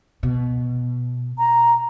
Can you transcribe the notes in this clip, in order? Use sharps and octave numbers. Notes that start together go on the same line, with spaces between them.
B2
A#5